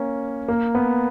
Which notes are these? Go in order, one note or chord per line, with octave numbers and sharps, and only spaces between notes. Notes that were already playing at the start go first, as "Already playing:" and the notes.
Already playing: A#3 C#4
A#3
B3